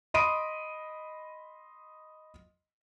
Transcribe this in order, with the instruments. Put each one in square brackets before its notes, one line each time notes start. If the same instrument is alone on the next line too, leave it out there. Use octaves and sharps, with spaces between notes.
[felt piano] D#5 B5 C6 D#6 D7 D#7